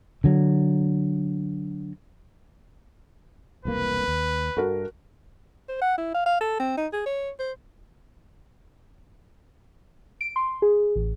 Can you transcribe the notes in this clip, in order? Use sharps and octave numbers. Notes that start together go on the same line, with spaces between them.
D3 F#3
E1 C2 A#3 B4
D#2
G2 F#4 A4 A#4
C5
F#5
E4
F5
F5
A4
C4
D#4
G#4
C#5
C5
D7
C6
G#4
A1